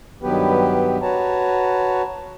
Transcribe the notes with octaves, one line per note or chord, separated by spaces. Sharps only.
G2 D#3 F#3 B3 G4 B4
F#4 B4 C#5 A5 A#5